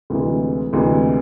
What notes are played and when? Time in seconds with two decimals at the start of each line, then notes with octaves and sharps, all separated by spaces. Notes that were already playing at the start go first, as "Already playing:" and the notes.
0.10 D2 C3 E3 G#3
0.73 D2 C3 E3 G#3